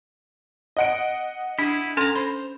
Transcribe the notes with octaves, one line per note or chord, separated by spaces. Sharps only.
D#5 F#5 D7
D4 E4 G#4
C#4 A4 G#5 A#5 C6
C5 B5